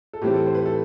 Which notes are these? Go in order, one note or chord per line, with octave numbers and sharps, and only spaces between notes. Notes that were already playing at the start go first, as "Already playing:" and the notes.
A4
A2 E3 G3 C4 G4
A4
C5
B4
A4